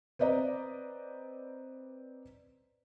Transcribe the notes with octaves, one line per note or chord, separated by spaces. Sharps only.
C4 B4 D5 D#5 A#5